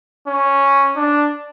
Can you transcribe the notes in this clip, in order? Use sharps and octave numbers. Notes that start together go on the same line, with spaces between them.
C#4
D4